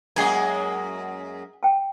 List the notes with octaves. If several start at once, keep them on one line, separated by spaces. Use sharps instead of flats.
F#2 G#3 A#3 G#4 G#5
G5 A5